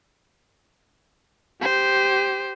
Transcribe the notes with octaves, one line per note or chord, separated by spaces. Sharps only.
G4 C5